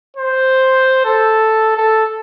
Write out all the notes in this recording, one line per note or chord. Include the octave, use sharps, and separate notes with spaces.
C5
A4
A4